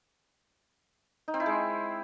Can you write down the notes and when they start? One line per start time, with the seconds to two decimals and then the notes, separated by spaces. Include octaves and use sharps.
1.28 D#4
1.34 C4
1.40 E4
1.46 G#3